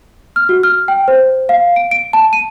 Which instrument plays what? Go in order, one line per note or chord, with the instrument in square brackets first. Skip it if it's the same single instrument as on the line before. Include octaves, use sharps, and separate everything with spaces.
[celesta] F6
F#4
F6
G5
C5
F5
D7
D7
A5
D#7